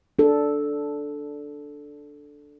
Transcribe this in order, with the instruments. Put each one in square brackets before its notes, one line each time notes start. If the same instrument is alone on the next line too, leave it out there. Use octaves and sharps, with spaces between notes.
[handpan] D4 A4